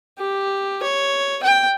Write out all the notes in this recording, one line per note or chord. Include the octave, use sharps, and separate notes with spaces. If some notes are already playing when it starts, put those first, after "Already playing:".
G4
C#5
G5